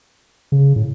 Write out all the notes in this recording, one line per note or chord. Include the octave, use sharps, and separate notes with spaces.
C#3
A2